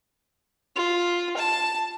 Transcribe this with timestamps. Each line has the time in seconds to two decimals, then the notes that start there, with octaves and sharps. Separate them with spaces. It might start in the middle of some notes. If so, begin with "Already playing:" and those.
0.76 F4
1.37 A5